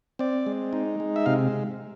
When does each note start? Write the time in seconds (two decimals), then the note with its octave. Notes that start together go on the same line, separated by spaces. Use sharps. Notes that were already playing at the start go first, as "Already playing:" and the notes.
0.19 C4 D5
0.46 G#3
0.73 D#4
1.00 G#3
1.16 E5
1.26 C3 F5